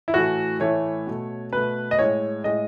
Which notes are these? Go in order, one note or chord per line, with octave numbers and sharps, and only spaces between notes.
E4
A2 E3 A3 F#4
A2 E3 A3 C#5
B2 A3
B2 A3 B4
D#5
A2 G#3 C#5
A2 G#3 D#5